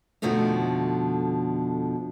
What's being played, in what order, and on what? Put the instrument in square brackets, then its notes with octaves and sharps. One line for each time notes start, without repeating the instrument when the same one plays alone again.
[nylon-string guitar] F2 B2 D3 F3 A3 D#4